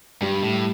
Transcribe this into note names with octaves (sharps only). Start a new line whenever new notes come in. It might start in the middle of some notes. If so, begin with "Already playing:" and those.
G2 G3
A2